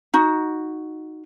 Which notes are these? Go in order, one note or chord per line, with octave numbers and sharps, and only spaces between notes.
D#4 F#4